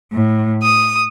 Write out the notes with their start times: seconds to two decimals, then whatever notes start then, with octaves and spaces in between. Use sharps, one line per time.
0.11 A2
0.63 D#6